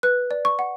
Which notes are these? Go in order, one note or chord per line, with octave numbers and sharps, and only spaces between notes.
B4 F#6
D5
C#6
F#5